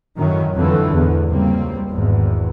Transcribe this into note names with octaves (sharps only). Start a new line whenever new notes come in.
F#2 A2 D#3 F#3 C#4
F2 D3 E3 A3
E2 G#2
C#2 G3 A#3 C4
G#1 E2